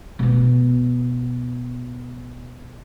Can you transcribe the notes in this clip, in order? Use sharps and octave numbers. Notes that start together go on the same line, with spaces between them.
B2 B3